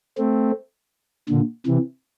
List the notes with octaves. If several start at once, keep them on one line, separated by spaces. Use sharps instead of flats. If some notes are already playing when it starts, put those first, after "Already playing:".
A3 C4
A#2 D3
C3 E3